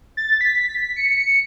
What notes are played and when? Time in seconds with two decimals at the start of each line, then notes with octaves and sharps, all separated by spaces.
0.17 A6
0.41 B6
0.96 C#7